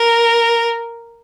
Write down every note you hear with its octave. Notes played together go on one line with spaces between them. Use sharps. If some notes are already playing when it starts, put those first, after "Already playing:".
Already playing: A#4